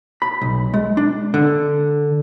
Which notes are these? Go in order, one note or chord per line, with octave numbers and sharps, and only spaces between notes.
B5
B1
G#3
D4
D3